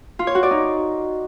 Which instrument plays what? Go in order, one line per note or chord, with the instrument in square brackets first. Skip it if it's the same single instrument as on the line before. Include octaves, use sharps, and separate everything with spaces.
[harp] F4
C#5
F#4
D5
D#4